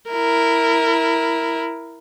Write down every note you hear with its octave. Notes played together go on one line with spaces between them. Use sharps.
E4 A#4